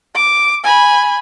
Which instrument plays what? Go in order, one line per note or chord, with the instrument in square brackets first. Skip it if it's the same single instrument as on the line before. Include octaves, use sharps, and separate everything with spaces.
[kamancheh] D6
G#5 B5